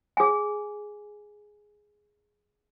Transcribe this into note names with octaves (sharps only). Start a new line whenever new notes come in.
G#4 G#5